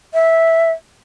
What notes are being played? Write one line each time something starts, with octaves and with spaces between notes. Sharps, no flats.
E5